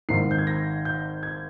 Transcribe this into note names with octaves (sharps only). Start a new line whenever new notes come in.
G#1 G#2 D#3 C7
G6
G#6
A#6
G6
G#6